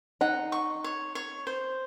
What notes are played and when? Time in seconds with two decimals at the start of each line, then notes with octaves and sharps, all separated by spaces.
0.21 D#4 F#5
0.52 C#6
0.84 C#5
1.15 C#5
1.47 C5